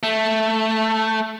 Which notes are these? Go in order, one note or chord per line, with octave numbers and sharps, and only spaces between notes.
A3